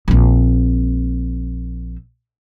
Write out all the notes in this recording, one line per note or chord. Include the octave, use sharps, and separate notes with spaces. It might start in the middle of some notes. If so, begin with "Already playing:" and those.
A#1 C4